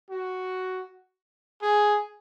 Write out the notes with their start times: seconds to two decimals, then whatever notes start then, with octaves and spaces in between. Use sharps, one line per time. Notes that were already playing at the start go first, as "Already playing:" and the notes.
0.11 F#4
1.62 G#4